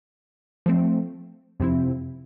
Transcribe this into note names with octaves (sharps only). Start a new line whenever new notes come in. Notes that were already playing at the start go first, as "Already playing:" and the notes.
F3 A3 C4
F2 C3 F3 C4 E4